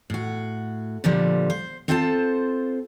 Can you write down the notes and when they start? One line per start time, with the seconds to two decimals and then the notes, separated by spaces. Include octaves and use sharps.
0.10 A2 F#4
1.04 A#2 D3 F3 G3
1.50 C5
1.88 C4 F4 A4 C5 E5 A5